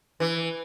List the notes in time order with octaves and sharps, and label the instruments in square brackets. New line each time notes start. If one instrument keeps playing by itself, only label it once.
[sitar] E3